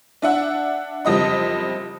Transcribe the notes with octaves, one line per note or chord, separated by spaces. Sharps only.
D4 E5 F#5
F#1 F2 G3 D#5 D#6